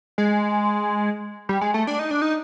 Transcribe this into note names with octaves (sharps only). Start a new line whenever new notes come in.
G#3
G3
G#3
A3
D4
D#4
D4
D#4